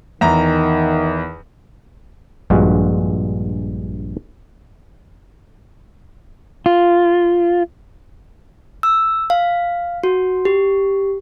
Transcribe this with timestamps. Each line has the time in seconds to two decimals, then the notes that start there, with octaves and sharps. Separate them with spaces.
0.21 E2 D#3 A#5
2.50 A#1 G2 G#3 F4 F#4
6.66 F4
8.83 E6
9.30 F5
10.03 F#4
10.45 G4